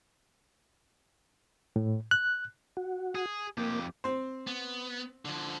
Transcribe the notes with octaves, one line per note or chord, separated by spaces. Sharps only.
A2
F#6
F#4
G#4
F2 A#3 G4
C4 C5
B3
D3 F3